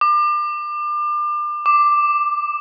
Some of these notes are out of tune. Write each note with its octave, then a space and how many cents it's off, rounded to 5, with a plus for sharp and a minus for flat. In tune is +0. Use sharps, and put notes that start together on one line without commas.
D6 +30
D6 +5